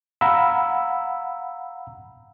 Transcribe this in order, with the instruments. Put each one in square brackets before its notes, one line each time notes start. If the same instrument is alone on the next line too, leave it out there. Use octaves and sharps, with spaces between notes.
[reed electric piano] F5 F#5 A#5 B5 E6